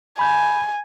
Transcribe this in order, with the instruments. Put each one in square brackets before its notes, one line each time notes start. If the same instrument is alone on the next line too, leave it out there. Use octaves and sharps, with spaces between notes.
[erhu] G#5 [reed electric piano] B5 G6